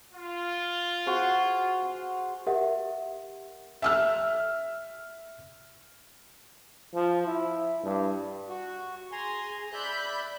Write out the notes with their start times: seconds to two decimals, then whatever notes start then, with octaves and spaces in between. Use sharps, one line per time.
0.13 F4
1.06 F#4 G#4 C5
1.82 F#5
2.47 G4 A#4 E5 F#5
3.82 E5 E6 F6
6.94 F3
7.26 E4
7.83 G2
8.49 F#4
9.12 G#4 G#5 A#5 C6
9.73 D5 E5 B5 F#6 G6